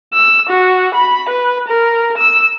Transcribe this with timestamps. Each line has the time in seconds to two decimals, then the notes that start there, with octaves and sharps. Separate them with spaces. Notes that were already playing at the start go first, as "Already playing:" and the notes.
0.14 E6
0.50 F#4
0.94 B5
1.29 B4
1.68 A#4
2.18 E6